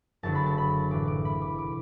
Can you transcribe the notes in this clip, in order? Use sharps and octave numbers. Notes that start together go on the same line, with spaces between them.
F#1 F#2 D3 A5
B5
A5
B5
A1 A2 E3 D6
D6
B5
D6
B2 D6